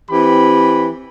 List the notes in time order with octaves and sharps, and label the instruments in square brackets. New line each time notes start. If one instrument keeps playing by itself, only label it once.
[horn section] E3 C4 G4 B5